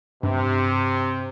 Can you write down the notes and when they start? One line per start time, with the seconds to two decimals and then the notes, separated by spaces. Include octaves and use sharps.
0.23 G2 C3